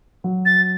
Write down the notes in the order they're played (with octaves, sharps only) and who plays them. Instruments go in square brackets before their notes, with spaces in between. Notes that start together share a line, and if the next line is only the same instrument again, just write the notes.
[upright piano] F#3
[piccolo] A6